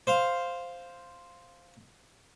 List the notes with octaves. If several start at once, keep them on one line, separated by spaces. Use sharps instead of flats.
C5 F5